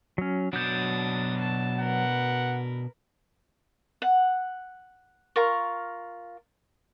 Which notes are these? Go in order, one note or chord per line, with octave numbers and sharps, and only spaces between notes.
F#3 C#4
B2 F#3 D4 D#6 G6 A6
A5
A#4 B4 F#5
F#5
F4 A#4 C#6